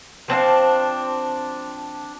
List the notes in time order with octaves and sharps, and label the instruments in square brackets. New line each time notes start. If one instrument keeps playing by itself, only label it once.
[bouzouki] F3 C4 D4 F5